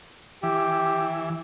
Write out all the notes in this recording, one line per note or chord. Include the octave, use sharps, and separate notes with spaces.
E3 G4